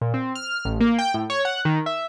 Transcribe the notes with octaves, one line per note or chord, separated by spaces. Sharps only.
A#2
C4
F6
A1
A#3
G5
A2
C#5
F#5
D#3
E5